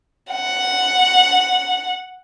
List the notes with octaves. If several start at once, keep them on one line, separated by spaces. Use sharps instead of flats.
F#5